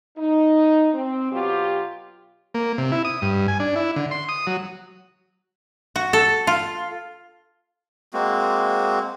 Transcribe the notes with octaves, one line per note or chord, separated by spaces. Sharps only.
D#4
C4
B2 F#3 F4 G4
A#3
C3
E4
D#6
G2
G#5
D4
E4
D3
C6
D#6
F#3
F#4
A4
F4
G#3 A#3 C4 F#4